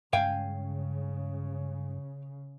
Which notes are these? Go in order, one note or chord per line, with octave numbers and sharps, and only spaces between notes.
G2 C#3 G#3 C#4 F5 G5 G#5